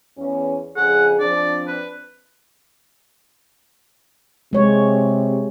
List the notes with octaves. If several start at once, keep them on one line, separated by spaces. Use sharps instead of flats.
E2 C#4
F2 C#3 G#4 F#5
F3 C4 D4 D5
B4
C3 G#3 C#5